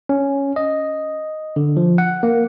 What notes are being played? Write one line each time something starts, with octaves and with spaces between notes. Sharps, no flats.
C#4
D#5
D3
F3
F#5
A#3